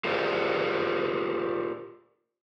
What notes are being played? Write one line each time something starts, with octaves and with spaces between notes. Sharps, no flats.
F4 G4 G#4 A#4 C5 D5